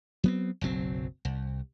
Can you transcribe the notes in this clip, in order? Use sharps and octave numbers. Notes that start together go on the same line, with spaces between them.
F#3 B3 C4
F#1 B1 F#3 C4
C2